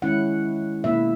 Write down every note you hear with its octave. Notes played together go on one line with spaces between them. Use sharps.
D#3 G#3 C#4 E4 F#5
B2 A#3 E4 E5